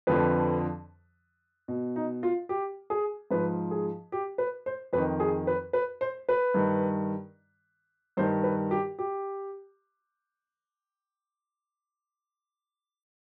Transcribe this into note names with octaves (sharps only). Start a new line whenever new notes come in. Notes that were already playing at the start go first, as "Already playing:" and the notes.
F2 D3 F3 B4
B2
D#4
F4
G4
G#4
G#2 F3 B4
G#4
G4
B4
C5
F2 D#3 B4
G#4
B4
B4
C5
B4
G2 D#3
G2 D#3 C5
B4
G4
G4